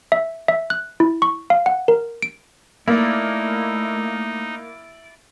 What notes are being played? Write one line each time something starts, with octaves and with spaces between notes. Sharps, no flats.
E5
E5
F#6
E4
C#6
F5
F#5
A#4
D7
A3 A#3 D#4 E4 D5